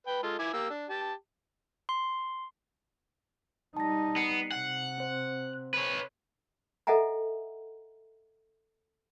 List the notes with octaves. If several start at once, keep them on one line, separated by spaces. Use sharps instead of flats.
B4 G5
G#3 F4 A4
E4 G#5 D6
A#3 G4 E6
D4
G4 A5
C6
G3 D#4 A5 A#6
B3 C7 C#7
C3 F#5
C4 C5
B4 C#5
A4 D#5 E5 F#5 G#5 A#5